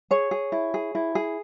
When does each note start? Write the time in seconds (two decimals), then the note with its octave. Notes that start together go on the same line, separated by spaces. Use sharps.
0.11 G#4 C#5
0.31 G#4
0.52 E4
0.74 G#4
0.95 E4
1.15 G#4